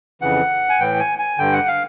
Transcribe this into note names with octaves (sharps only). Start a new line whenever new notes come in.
F2 C#3 E3 F#5
G#5
A2 E3 G5
G#5
G#5
G2 D3 G5
F#5
F5